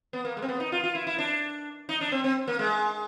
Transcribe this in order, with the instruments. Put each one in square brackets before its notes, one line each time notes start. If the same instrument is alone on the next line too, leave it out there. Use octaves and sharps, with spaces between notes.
[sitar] B3
A#3
G#3
C4
B3
D#4
F4
F4
E4
E4
D4
D#4
D4
C4
C4
A#3
G#3